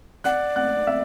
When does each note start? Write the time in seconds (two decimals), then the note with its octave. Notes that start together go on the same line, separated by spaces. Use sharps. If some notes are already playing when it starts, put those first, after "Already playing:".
0.24 D5 F#5 F#6
0.56 F#5 F#6
0.87 E5 E6